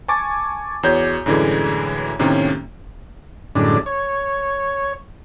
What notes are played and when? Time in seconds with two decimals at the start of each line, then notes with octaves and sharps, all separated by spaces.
0.08 G#5 A5 C#6 D6 A6
0.83 E2 F#4 C#5 G6
1.26 F#2 A2 D3 E3 G#3
2.19 A2 C3 D#3 A#3 C#4
3.55 F#2 A2 D3 G3 G#3 D4
3.86 C#5